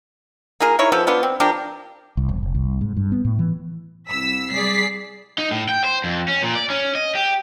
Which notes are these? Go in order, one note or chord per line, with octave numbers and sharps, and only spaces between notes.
A#3 F4 G#4 A#4
D#4 E4 C#5
F3 B3 A4
B3 D4 F4
C4
F3 D4 G4 A#4
C2
E1
F1
C2
G#2
G2
B3
A2
E3
C2 E6 B6
G3 G#4 D5 B6 C7
D#4
A2
G5
C5
F2
C#4
A#2
D5
C#4
D#5
G4